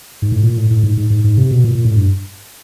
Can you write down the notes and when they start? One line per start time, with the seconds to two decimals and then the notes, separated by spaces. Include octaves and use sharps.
0.22 G#2
0.32 A2
0.43 A#2
0.57 A2
0.70 A2
0.83 G#2
0.97 G#2
1.10 G#2
1.24 G#2
1.38 C3
1.51 B2
1.64 A#2
1.75 A#2
1.85 A2
1.96 G2